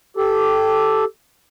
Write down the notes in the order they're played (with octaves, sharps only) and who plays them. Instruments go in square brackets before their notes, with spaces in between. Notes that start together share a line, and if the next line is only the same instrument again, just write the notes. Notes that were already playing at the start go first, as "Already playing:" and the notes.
[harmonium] G4 A4